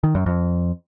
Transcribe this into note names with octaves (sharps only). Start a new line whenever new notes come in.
D#3
F#2
F2